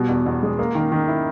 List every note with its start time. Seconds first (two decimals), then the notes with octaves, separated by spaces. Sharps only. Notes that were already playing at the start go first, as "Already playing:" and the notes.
Already playing: B2 G3
0.09 E2
0.26 E2
0.43 G#3
0.59 A#3
0.75 D#3
0.92 D#3
1.08 E4